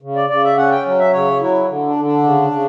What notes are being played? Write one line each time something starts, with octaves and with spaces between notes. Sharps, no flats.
C#3
D5
C#3 D5
E5
C#4 F#5
G5
F#3
E5
C#3 C#5
F#3 E4
D3
D4
D3
D4
C#3
C#3